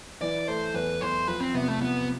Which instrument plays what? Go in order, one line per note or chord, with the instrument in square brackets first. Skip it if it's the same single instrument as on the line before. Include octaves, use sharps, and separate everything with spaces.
[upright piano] E3 [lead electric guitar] D5
[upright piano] A3 [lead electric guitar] C5
[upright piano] E2 [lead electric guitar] B4
[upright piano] E2 [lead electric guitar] C5
[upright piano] F3 [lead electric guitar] B4
[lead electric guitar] C4
[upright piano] C3 [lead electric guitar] B3
[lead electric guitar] A3
[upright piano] F3 [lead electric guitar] B3